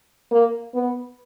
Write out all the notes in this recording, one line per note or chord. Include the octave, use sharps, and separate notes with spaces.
A#3
B3